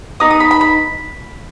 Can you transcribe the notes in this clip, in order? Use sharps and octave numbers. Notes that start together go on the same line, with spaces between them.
B3 D#4 D#6
D#6
B5
B5
B5